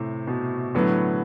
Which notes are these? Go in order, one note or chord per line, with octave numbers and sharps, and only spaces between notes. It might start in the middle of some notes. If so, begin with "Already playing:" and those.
Already playing: A2 C3
B2
A2 D3 F#3 B3